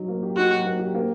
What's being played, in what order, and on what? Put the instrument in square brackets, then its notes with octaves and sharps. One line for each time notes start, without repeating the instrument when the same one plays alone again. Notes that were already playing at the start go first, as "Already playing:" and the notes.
Already playing: [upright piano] F#3 D#4
A#3
G4
[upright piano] D#4 [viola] F#4
[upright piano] F#3
A#3
G4
A#3